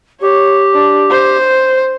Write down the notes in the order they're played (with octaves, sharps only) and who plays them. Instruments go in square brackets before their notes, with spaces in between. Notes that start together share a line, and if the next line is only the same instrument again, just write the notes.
[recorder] G4 [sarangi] C#5
[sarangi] D4
C5